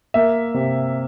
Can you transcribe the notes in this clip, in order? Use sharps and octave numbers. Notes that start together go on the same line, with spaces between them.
A#3 E5
C3